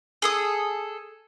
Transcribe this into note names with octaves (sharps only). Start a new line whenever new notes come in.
G#4 A4 D#6